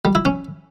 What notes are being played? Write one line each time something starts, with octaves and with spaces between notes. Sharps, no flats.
G3
E4
C#4